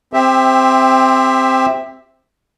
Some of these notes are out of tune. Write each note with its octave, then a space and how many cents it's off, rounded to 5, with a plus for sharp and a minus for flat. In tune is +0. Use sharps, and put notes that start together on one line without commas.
C4 +0 G4 +25 E5 +0